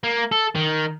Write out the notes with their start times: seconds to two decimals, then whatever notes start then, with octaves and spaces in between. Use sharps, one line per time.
0.04 A#3
0.32 A4
0.55 D#3